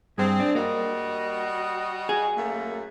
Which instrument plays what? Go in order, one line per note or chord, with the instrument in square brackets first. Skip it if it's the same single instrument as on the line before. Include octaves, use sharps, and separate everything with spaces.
[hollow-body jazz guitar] G2 [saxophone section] C4 G#4
[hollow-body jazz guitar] D4
[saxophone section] G3 F#4 D#5 [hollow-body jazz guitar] A#3
[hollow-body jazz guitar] G#4
[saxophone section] F#2 A3 A#3